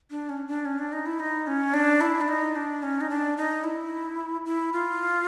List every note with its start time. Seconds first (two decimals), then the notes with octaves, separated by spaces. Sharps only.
0.11 D4
0.29 C#4
0.47 D4
0.65 C#4
0.79 D4
0.92 D#4
1.06 E4
1.19 D#4
1.47 C#4
1.74 D4
2.01 E4
2.21 D4
2.28 D#4
2.56 D4
2.83 C#4
3.01 D#4
3.10 D4
3.37 D#4
3.64 E4
4.45 E4
4.73 F4